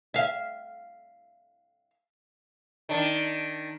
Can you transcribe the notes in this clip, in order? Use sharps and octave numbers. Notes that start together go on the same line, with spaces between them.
E5 F5
D#3 D4